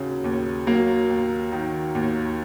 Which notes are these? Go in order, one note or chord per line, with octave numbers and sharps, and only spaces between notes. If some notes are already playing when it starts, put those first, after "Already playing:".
Already playing: D#2 C#3 F#3
D#2
F#3 A#3
D#2
D#3
D#2